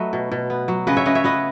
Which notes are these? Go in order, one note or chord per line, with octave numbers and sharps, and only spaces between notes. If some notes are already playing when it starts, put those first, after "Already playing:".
Already playing: F#3 A3 B4 D#5
B2
B2
B3
F#3
C#3 B4 D#5
C#5 E5
C#3 B4 D#5
C#5 E5
B3 B4 D#5